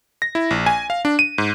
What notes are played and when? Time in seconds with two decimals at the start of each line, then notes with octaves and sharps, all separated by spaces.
0.22 A#6
0.35 E4
0.51 A#1
0.66 G#5
0.90 F5
1.05 D4
1.19 D#7
1.38 G#2